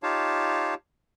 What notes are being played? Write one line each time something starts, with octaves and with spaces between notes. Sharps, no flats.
D#4 F4 G4 C#5 F5 A5